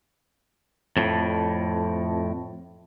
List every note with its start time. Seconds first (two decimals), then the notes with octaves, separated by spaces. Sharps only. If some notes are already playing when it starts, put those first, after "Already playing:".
0.97 F2 A2